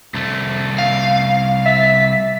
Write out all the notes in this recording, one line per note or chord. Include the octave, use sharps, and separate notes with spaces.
C2 A3
F5
E5 A6 B6